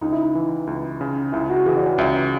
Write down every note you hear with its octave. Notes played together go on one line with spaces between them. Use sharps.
C#2 D#4
E4
D#4
E3
C#2
C#3
C#2 E4
F#4
E3 G#4
D5
C#5
C#2 E5